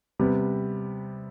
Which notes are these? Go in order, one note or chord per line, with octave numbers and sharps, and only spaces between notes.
C3 G3 B3